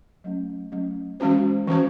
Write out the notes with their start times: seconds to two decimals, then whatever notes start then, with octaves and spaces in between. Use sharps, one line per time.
0.24 F#3 A3 C#4
0.72 F#3 A3 C#4
1.20 E3 G#3 C#4 F#4 C5
1.67 E3 G#3 C#4 F#4 C5